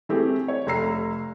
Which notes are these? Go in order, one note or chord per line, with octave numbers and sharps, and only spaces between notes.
E3 A3 C4 G4 G#4
C#5
F1 A3 A#5 E6 C7